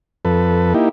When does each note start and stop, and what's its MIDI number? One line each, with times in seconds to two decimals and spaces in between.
0.25 0.74 41
0.25 0.74 69
0.25 0.74 71
0.74 0.89 58
0.74 0.89 63
0.74 0.89 64
0.74 0.89 67